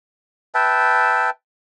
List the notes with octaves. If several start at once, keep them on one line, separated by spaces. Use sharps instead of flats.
B4 E5 G5 A5